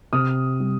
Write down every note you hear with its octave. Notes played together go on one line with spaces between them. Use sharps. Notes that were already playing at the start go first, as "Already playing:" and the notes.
C3 D#6 F6
G3